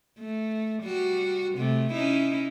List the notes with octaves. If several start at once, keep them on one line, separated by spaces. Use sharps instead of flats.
A3
G3 F#4
C3 A3
C#4 D#4 E4